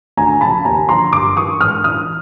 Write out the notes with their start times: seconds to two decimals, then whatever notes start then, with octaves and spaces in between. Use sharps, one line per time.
0.17 D2 G#5 A#5
0.41 C#3 F3 A5 B5
0.64 D#2 G#5 A#5
0.89 D3 F3 A#5 C6
1.12 G2 C6 D6
1.37 E3 C#6 D#6
1.61 G#2 D#6 F6
1.84 E3 D#6 F6